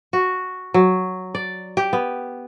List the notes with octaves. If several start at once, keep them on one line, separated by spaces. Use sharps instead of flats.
F#4
F#3
D5
G4
B3